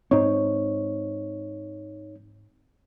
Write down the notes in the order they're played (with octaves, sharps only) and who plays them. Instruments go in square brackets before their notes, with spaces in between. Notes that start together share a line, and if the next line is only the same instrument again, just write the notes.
[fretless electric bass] G#2 C4 [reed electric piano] D#4 C#5